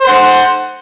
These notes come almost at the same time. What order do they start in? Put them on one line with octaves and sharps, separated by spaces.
C5 C6 F#5